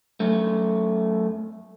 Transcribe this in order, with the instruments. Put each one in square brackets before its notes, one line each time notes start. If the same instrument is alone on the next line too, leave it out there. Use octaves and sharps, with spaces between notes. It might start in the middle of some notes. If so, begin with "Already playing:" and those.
[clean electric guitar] F#2 A3